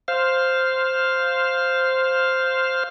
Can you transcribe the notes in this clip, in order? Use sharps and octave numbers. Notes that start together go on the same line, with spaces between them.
C5 F5